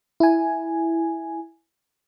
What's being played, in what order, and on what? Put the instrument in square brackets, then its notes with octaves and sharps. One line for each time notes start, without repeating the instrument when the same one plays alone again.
[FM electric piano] E4 G#5